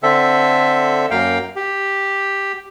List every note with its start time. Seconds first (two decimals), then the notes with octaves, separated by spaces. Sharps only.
0.03 D3 C4 A4 E5
1.11 F#2 A#3 F5 G5
1.56 G4